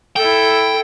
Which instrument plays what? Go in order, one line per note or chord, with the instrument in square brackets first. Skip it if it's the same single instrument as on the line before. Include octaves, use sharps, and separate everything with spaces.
[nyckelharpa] E4 A4 [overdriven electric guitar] G5